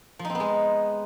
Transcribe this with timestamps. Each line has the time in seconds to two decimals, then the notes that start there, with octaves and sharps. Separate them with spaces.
0.19 F3
0.25 D#4
0.30 C4
0.35 B3
0.40 G#3